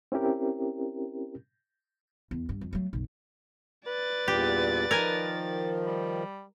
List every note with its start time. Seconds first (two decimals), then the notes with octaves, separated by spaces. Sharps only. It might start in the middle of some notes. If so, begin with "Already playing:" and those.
0.12 C4 C#4 E4 G4 A#4
2.31 E2
2.49 G2
2.61 F2
2.73 F#3 A3
2.93 B1 F#2
3.87 B4 D5 A6
4.28 E2 G2 A#2 G4
4.91 D#3 F3 A#4 G#5
5.86 G3